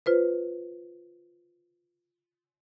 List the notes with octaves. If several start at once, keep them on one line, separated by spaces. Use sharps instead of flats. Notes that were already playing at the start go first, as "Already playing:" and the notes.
F4 B4 C5